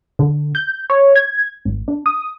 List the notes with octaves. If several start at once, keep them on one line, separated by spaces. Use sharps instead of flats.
D3
G6
C#5
G#6
G#1
D4
D#6